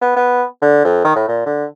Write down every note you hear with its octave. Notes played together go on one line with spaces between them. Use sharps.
B3
B3
D3
F2
D#3
A2
A#2
D3